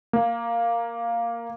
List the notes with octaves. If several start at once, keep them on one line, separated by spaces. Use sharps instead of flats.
A#3